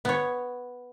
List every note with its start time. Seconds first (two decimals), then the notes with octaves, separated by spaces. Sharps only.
0.05 B3 C#5